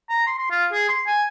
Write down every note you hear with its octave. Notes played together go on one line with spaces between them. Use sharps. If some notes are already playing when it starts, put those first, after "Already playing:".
A#5
C6
C6
F4
G#4
C6
G#5